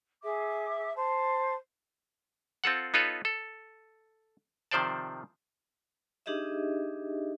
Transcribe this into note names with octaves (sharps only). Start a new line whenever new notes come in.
G#4 E5 D6
C5 A5
C4 F4 A4 F#5
B3 D#4 F4 A4 B4 C#5
A4
C3 D#3 F3 C5 D5 A5
D4 D#4 G4 G#4 D#5 E5